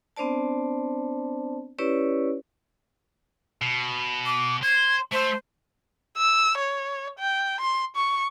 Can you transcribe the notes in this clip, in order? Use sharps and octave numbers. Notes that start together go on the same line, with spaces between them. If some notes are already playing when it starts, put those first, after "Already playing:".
B3 C4 D4 C5 D5 A5
C#4 E4 G4 B4 C#5 D5
B2
D6
C5 G#6
A3 C5 E5
E6
C#5
G5
C6
C#6